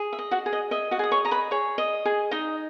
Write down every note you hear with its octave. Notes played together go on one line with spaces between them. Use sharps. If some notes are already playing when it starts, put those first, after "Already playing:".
Already playing: G#4
E5
D#5
F#4 F#5
G#4
D#5
D#5 E5
F#4 F#5
G#4 D#6
C#5 C#6
D#5 A#5
B4 B5
G#4 C#5 C#6
D#5
G#4
D#4 D#5 D#6